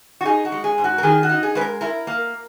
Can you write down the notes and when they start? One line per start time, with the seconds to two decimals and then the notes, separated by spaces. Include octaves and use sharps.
0.21 F#4
0.25 D#4 G#4
0.45 F#4
0.52 G#3
0.64 G#4
0.78 G#2
0.84 F#4
0.98 A#4
1.03 D#3 G#4
1.23 F#4
1.29 D#4
1.43 G#4
1.55 G#3 B4
1.61 A#4
1.81 E4 A#4
2.07 A#3